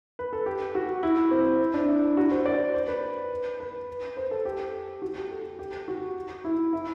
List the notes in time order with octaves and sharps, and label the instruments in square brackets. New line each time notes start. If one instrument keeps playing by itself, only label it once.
[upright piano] B4
A4
G4
F#4
E4
C4
D4
E4
F#4
C5
D5
C5
B4
B4
C5
A4
G4
F#4
G4
A4
G4
F#4
E4
E4